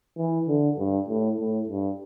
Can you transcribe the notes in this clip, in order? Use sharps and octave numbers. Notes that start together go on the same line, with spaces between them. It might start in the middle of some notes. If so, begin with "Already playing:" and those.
E3
D3
G2
A2
A2
G2